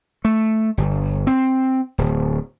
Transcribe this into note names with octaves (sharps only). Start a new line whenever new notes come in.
A3
G1
C4
D1